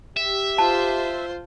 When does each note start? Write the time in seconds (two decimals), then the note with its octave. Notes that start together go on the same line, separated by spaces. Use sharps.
0.17 G4 E5
0.58 F4 C5 A5